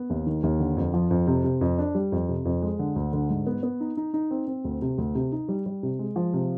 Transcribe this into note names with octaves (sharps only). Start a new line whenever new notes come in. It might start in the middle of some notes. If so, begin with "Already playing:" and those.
Already playing: B3
D#2
D#3
D#2
D3
F2
F3
F2
C3
C3
F2
D4
G3
F2
C3
F2
G#3
D3
D2
D3
G#2
B3
B3
D#4
D#4
D#4
C4
C4
D2
C3
D2
C3
D#4
G3
G3
C3
G#3
F3
C3